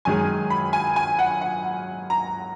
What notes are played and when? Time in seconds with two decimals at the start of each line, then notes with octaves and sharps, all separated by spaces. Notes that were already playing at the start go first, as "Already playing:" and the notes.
0.05 F#2 D#3 G#3 G#5
0.50 B5
0.73 G#5
0.96 G#5
1.19 F#5
1.41 F#5
2.10 A#5